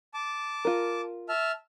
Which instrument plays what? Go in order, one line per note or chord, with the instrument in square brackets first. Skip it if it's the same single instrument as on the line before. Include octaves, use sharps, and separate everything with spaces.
[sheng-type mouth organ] A5 D6
[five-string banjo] F4 A#4
[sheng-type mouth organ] E5 A5 F6